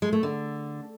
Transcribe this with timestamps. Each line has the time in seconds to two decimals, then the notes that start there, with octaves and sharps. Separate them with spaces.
0.02 G#3
0.13 A3
0.23 D3